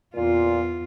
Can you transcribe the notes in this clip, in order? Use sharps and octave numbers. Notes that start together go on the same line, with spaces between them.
E2 A#2 F4